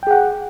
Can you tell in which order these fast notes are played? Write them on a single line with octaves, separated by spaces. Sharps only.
G5 G#4 F#5